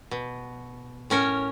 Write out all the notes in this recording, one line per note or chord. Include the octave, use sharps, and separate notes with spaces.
B2
A2 C#4 A#4 C#5